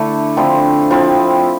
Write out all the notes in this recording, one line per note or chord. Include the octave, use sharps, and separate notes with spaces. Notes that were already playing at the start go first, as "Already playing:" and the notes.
Already playing: D3 A3 D4 E4 A4
D3 F3 C4 E4
F3 C4 E4